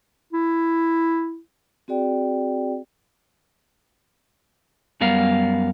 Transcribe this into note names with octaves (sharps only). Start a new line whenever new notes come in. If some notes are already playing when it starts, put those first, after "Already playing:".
E4
C4 F#4 G#4 D5 G5
F#2 G3 B3 A#4 F5